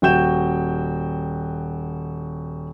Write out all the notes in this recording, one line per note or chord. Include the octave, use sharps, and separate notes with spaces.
D#1 F#4 G5 G6 E7